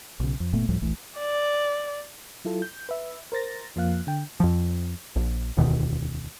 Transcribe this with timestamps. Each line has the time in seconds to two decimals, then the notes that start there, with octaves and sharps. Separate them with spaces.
0.20 B1 C#3
0.40 F2
0.53 F#1 A#2 A3 B3
0.69 D2 A2 F3 G3
0.81 D#1 A#1 E3 A3
1.19 D5
2.45 F#3 E4 F4 A4
2.62 G6
2.89 B4 E5
3.32 A#4 C5 A6 A#6
3.76 F2 F3 A#3 F5 F#6
4.07 D3 G5
4.40 F2 F3
5.16 A#1
5.57 E1 D2 B2 D#3